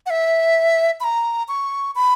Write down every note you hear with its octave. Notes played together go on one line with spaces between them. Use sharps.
F#5
E5
B5
A#5
C#6
B5